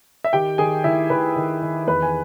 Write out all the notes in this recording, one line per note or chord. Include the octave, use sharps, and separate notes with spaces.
E5
D#3 G4 G5
D#3 G#4 G#5
D#3 E4 E5
D#3 B4 B5
D#3
D#3
E2 B4 B5
G#5